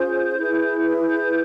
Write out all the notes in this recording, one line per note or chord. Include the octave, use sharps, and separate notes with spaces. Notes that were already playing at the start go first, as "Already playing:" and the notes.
Already playing: C#4 F4 G#4 C5 G6
E4 G#4 B4
G6